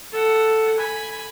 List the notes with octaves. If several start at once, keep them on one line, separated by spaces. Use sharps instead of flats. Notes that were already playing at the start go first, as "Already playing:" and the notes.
A4 F#5
G#5 B5